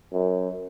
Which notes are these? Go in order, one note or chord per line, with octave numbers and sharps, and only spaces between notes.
F#2